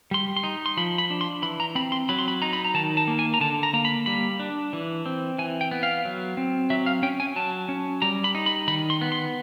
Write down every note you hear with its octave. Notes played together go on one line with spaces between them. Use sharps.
G3 C6
C6
D#4
C6
F3 B5
B5
D4
C6
E3 B5
A#5
C4 B5
C6
F#3 B5
C6
B5
D#4 A#5
B5
A#5
D#3 A5
A5
A#3
G#5
A#5
D3 A5
A#5
A#3 A#5
B5
G3 B5
D4
E3
C4
E3 G#5
G5
B3
F5
F#3
C4
F#3 E5
F5
C#4 G5
G#5
F#3 A5
C#4
G3 A#5
B5
D#4
B5
D#3 B5
C6
B3
C6